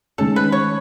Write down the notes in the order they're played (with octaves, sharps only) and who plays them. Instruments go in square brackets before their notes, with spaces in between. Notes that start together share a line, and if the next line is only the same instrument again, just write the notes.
[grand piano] D#3 G#3 C#4 [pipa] A4
[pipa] B4
C#5